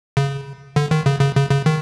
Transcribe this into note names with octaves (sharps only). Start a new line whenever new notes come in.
C#3
D3
D#3
C#3
C#3
C#3
C#3
D#3